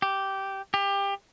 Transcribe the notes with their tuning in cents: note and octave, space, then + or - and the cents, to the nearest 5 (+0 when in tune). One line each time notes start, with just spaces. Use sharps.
G4 -10
G4 +25